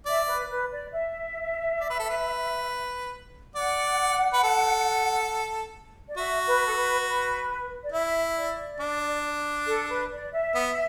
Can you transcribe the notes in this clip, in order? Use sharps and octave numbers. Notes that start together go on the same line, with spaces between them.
D5 E5
B4
B4
D5
E5
D5
B4
A4
B4
D5 F#5
B4
A4
D5
F#4 E5
B4
A4
B4
B4
D5
E4 E5
D5
D4
A4
B4
D5
E5
B3